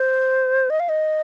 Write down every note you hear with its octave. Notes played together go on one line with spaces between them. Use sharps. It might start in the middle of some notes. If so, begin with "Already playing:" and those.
Already playing: C5
D#5
F5
D#5